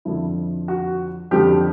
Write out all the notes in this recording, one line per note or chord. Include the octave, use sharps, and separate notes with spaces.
F2 D3 F3 E4
F#4
F2 D3 F3 G4